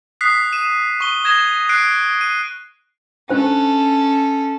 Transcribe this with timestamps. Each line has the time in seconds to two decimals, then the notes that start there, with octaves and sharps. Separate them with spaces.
0.21 D#6 F#6 B6 C7
0.52 D#7 E7
1.00 C#6 G7
1.24 D#6 G#6 A#6 E7 G7
1.69 F#6 C7 D7
2.21 D#7
3.30 C#4 D4 A4 C5 G#5